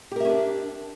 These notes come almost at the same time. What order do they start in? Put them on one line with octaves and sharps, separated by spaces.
G4 A#4 E5 C#4 D4